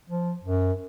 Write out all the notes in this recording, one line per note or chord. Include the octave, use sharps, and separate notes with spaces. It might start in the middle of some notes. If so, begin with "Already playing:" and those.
F3
F#2